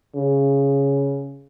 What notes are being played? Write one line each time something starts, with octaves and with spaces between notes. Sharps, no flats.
C#3